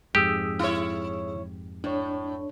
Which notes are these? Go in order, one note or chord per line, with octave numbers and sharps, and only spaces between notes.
F2 G#2 G4 G#4 D#6 E6
E4 C#5
A2 D4 C#5